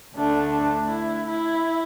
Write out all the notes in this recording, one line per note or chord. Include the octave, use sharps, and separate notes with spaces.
D2 D3 A3 D4
D4
E4
E4